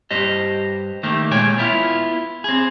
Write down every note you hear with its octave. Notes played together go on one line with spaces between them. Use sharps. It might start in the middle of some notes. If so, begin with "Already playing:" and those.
G2 G4 C5 D#5
D#3 A3 A#3 G4
A#2 G#3 C#5 G5 G#5
B3 E4 F4
C4 G#4